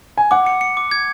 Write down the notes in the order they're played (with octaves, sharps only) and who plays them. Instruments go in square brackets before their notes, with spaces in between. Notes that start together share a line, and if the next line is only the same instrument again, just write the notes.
[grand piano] G#5
[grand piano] F#5 [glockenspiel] D6
[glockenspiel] C#7
C#7
D6
G#6